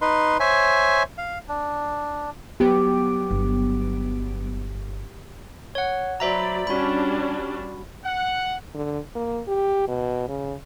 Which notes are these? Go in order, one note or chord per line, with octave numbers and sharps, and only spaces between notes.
D#4 B4 C6
C5 C#5 E5 G#5
F5
D4
F#3 B3 G4 D7
G1
C#5 F#5
F#3 C5 D5 E5 A#5 B5
G3 C#4 D4 F#4 B5
F#5
D3
A#3
G4
B2
C#3